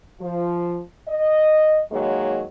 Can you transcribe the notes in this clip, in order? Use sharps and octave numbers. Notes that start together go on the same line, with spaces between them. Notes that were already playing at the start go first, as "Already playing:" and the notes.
F3
D#5
D#3 F#3 G#3 A#3 C#5 D#5